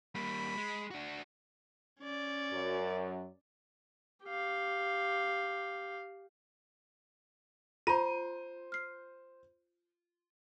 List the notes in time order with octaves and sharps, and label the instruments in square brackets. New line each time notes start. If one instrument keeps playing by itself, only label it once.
[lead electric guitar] G3 A#3 [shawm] B5
[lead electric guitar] G#3
D4 F#4
[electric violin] C#4 D5
[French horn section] F#2 F#3
[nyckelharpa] G4 F5
[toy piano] F4 [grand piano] C5 D#7 [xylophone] A#5
[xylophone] F6 C7